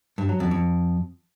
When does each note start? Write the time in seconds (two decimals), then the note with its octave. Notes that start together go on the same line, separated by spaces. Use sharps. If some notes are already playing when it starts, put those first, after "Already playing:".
0.18 G2
0.29 F#3
0.40 F2
0.51 F2